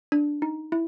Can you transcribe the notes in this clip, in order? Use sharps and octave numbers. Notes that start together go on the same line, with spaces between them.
D4
D#4
E4